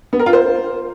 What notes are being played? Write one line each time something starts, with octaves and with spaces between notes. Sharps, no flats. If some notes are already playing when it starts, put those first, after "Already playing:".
B3
A#4
F4
C5